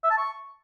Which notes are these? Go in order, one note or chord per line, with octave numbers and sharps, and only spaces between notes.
E5
A5
C#6